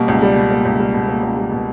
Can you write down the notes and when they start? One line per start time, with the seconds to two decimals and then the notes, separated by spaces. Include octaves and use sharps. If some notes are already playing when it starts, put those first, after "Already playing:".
Already playing: B2 G3 A#3
0.08 C#2
0.22 G3
0.36 B2
0.51 A#3
0.65 C#2
0.80 G3
0.94 B2
1.08 A#3
1.23 C#2
1.37 G3
1.51 B2